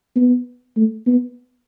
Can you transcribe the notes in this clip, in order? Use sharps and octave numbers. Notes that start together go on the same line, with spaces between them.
B3
A3
B3